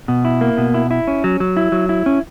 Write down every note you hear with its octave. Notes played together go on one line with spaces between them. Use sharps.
B2
E4
A#3
B2
E4
E4
C#4
F#3
F#3
E4
F#3
E4
C#4